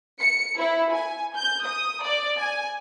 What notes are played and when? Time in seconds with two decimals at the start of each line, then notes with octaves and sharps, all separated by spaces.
0.20 C#7
0.59 E4
0.93 G#5
1.36 G6
1.65 D#6
2.04 D5
2.41 G#5